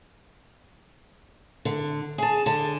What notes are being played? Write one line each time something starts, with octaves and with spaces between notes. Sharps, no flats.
D3
G#4 A5
D3 A5